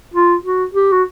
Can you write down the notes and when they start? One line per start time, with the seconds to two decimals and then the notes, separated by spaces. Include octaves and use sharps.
0.14 F4
0.44 F#4
0.74 G4
0.92 F#4